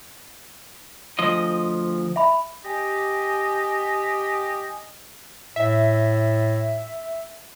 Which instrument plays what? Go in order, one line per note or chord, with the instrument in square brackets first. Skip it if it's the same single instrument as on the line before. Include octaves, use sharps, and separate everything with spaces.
[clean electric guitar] D2 F3 D#5
[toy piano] E5 B5
[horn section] G4 [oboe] D#5 [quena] G#5
[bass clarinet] A2 [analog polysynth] E5